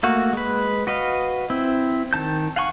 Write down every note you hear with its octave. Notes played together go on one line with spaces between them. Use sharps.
A3 A#3 F#4
G#3 B4
F#4 B4 D#5 F5
C4 E4
D#3 A5 G6
F5 F#5 G#5 C6 C#6